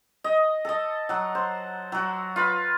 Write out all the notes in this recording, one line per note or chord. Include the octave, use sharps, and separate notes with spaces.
D#5
A4 D#5
F#3 F#5
C5
F#3 F#4
F4 B4